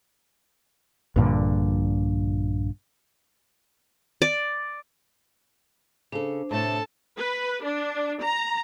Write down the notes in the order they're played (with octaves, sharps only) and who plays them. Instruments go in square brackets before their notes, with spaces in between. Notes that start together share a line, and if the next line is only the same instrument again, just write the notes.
[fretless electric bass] A#1 G2 A#2 D3
[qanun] D5
[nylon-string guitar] C#3 A4 [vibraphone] D4 C5
[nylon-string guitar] A2 C3 A3 [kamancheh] A4 A5
[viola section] B4
D4
A#5